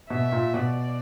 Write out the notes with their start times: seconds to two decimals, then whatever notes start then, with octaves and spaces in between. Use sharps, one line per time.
0.10 B2 E5
0.32 A#2
0.54 B2 D5